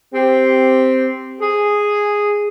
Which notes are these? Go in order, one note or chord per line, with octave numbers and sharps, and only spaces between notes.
C4 G4
G#4